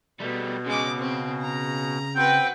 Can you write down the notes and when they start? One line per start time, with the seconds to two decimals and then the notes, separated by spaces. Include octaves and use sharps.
0.20 B2 G3 A3
0.66 C#3 G#3 D6
0.99 C4
1.42 A#5
2.15 C4 F#4 B4 G5